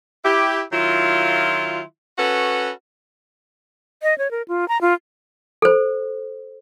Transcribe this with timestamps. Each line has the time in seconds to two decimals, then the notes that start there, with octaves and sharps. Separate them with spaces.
0.25 E4 G4
0.72 D#3 F#3 E4 F4
2.18 C#4 F#4 A4 B4
4.03 D#5
4.18 C#5
4.31 A#4
4.48 F4
4.68 A#5
4.81 F4
5.62 A4 C5